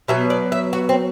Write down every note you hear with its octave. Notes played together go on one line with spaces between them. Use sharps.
B2 F#3 B3 E5
D5
E5
F#4
C4